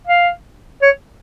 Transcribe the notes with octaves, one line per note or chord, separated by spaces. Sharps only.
F5
C#5